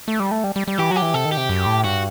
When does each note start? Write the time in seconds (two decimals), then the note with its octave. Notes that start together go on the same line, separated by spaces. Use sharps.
0.08 A3
0.20 G3
0.31 A3
0.44 G3
0.56 G3
0.68 G3
0.78 E3 G4
0.91 F#3 F#4
0.96 G4
1.02 E3
1.14 C3 A4
1.25 D#3
1.32 G4
1.37 C3
1.49 F#2
1.66 A2
1.84 G2 F#4